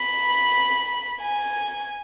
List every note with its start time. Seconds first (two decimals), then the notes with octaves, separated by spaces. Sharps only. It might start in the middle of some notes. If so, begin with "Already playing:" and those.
Already playing: B5
1.22 G#5